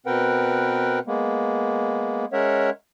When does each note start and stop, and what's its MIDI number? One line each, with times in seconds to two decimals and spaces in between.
0.06 0.99 47
0.06 0.99 60
0.06 0.99 70
0.06 0.99 71
0.06 0.99 78
0.06 0.99 79
1.07 2.25 56
1.07 2.25 58
1.07 2.25 59
2.33 2.70 56
2.33 2.70 61
2.33 2.70 70
2.33 2.70 73
2.33 2.70 76
2.33 2.70 78